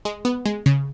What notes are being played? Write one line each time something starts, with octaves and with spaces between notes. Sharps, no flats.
G#3
B3
G#3
C#3